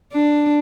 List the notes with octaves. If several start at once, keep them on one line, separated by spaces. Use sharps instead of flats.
D4